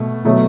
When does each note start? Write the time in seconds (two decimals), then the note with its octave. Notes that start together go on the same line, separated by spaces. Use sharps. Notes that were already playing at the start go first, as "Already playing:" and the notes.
Already playing: B2 A3
0.25 B2 F#3 A3